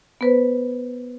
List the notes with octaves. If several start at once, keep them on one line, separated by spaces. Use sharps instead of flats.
B3 B4 C5